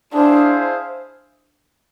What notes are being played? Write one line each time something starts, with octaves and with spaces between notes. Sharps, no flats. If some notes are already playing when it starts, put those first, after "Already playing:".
D4 E4 G#4 C5 F5